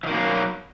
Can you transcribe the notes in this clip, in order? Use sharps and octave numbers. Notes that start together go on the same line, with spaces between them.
B2 D#3 E3 F#3 A#3